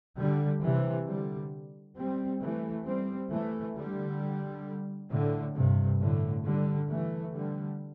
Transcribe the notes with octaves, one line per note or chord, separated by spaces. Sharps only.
D3 G3
C3 E3
D3 G3
G3 C4
E3 A3
G3 C4
E3 A3
D3 G3
A2 D3
G2 C3
A2 D3
D3 G3
E3 A3
D3 G3